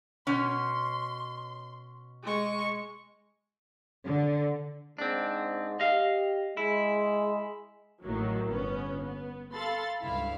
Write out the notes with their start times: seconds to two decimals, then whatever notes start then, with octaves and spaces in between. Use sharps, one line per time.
0.27 B2 C#4 C6
2.23 G#3 C#6
4.05 D3
4.98 G#2 C4 D4
5.80 G4 D#5 F5
6.57 G#3 E4
8.02 A1 A2 D#3 F#3
8.49 G1 B3 C#4
9.02 B3
9.53 A4 F5 B5 C6 A6
10.01 C#2 G2 E4 F5